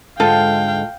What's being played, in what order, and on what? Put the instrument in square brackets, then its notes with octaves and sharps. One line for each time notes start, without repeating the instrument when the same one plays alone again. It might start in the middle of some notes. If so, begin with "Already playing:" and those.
[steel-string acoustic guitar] G#2 D3 G#3 [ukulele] F4 A4 [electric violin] F5 G5